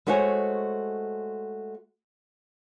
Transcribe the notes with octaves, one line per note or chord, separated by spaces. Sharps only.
G#3 A3 F#4 C5 C#5 G#5